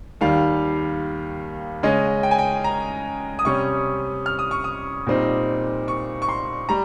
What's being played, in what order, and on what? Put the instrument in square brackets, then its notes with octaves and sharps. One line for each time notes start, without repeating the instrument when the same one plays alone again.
[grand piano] D#2 D#3 G3 F5
C#3 G#3 C#4 D#5
G5
G#5
G5
A#5
D#6
C3 G3 C#4 C#6
F6
D#6
C#6
D#6
A#2 G3 C4 D#4
C#6
C#6
C6
G3 A#5